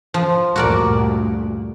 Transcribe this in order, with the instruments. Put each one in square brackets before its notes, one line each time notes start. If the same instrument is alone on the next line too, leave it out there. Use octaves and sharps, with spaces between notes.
[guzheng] F3
[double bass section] D2 G2 A#2 [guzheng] F#4 A#4 D5